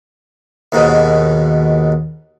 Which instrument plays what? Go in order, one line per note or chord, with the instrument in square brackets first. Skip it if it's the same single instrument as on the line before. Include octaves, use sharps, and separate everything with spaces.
[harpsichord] D#2 G#2 B2